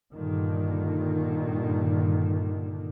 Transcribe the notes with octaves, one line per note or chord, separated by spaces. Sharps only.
G2 A#2 D3 D#3